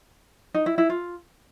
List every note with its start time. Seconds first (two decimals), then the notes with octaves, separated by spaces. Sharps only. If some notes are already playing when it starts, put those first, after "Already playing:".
0.54 D#4
0.66 E4
0.78 E4
0.90 F4